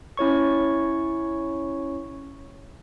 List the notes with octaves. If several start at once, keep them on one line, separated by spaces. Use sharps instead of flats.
C#4 E4 C#5 C#6